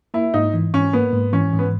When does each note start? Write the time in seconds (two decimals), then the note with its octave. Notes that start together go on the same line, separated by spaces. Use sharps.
0.14 A#3 E4
0.34 G#2 D#4
0.54 E3
0.74 G#2 C#4
0.93 A#3 B3
1.13 G#2
1.33 E3 C#4
1.53 G#2
1.59 B3